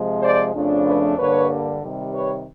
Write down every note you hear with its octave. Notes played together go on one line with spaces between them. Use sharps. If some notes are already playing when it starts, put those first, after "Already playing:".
Already playing: C3 F3 G#3
C5 D5
F2 C#3 F3 A3 D4
B4 C#5
G2 D3 G3 A#3 B4 C#5
C3 D#3 G3
B4 C#5